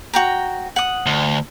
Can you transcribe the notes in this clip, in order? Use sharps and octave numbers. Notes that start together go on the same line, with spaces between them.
F#4 G5 A#5
F#5 D#6
D2